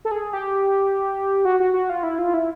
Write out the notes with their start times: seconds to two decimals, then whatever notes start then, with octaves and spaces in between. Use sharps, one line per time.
0.05 A4
0.11 G#4
0.33 G4
1.45 F#4
1.60 F#4
1.74 F#4
1.90 F4
2.03 E4
2.18 F4
2.34 E4